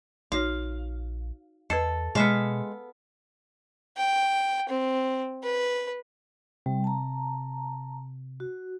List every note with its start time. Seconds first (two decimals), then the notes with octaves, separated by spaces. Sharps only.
0.32 A#1 D#4 F#4 C#5 F5
1.70 E2 A4 B4 D#5
2.15 B2 G#3 B3 E5 F5
3.97 G5
4.69 C4
5.44 B4
6.66 C3 G3
6.84 A5 A#5
8.40 F#4